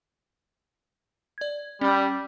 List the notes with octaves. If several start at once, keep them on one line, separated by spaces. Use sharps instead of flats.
D5 G#6
G3 C#4